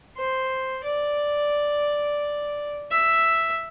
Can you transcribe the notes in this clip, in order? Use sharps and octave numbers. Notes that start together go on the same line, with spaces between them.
C5
D5
E5